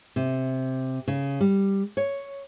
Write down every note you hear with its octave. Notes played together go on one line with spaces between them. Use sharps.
C3
C#3
G3
C#5